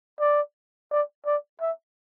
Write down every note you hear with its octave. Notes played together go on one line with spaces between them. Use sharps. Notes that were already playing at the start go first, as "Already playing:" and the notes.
D5
D5
D5
E5